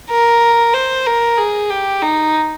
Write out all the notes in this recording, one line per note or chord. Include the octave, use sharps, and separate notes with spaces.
A#4
C5
A#4
G#4
G4
D#4